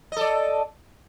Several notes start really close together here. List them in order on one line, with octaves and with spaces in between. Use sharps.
D#5 A4 D5